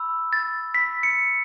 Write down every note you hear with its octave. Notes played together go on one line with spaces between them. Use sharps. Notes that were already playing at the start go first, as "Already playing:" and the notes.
Already playing: B5 E6
A6
B5 E6 B6
C#7